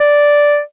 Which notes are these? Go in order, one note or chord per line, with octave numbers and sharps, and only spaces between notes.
D5